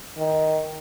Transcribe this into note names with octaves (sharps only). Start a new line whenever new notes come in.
D#3